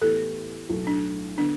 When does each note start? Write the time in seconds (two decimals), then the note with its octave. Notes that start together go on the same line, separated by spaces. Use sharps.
0.01 A2 E3 B3 G4 A4
0.70 B1 A2 A3
0.87 D4
1.38 D3 B3 D4